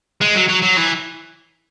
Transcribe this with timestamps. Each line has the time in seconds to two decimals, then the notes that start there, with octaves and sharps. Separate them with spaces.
0.21 G#3
0.35 F#3
0.48 F#3
0.62 F#3
0.77 E3